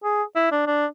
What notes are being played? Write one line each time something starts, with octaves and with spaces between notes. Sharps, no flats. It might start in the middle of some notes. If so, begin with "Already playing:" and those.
G#4
E4
D4
D4